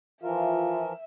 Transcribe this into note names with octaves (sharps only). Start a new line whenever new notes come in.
E3 F3 F4 A#4 E5